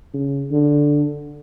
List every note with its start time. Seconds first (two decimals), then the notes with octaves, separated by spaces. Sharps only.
0.14 C#3
0.52 D3